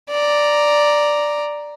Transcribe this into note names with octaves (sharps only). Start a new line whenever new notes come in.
D5 A#5